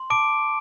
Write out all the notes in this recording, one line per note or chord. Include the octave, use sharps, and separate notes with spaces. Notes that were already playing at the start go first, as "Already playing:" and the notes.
Already playing: C6
A5 D6 D7